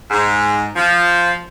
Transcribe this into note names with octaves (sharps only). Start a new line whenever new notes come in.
G#2
F3